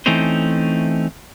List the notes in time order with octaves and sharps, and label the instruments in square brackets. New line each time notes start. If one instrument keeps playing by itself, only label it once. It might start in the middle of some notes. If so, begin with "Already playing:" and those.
[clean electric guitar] E3 A3 C4 C#4 D#4 C5